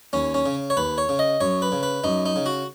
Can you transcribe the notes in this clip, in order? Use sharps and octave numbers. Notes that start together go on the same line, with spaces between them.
D#2 C#4
C#4
C#3
C#5
D#2 B4
C#5
C#3
D#5
F#2 C#5
B4
C#3
B4
F#2 D#4
D#4
C#3
F#4